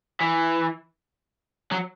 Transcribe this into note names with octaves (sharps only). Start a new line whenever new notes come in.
E3
F#3